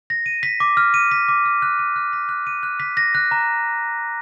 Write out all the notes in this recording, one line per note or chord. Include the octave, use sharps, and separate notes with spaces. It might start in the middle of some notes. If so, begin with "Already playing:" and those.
A#6
D#7
B6
D6
F6
D#7
B6
D6
F6
F#6
D#7
F#6
B6
F#6
D#7
F#6
B6
A#6
F#6
A#5